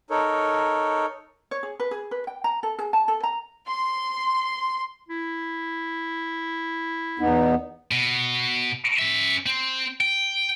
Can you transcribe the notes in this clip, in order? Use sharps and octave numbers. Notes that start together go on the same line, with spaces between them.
D#4 A4 A#4 C#5
C#5
G#4
B4
G#4
B4
G5
A#5
A4
G#4
A5
A4
A#5
C6
E4
E2 B3 D#4
B2
C#4 E5
C4
G5